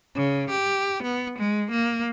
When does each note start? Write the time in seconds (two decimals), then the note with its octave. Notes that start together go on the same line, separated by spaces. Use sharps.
0.16 C#3
0.50 G4
1.03 B3
1.39 G#3
1.71 A#3